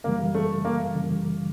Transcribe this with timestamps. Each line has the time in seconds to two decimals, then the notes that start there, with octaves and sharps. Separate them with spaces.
0.04 F#2 C#3 E3 G3 A#3
0.35 A3
0.65 A#3
0.95 F#2 C#3 E3 G3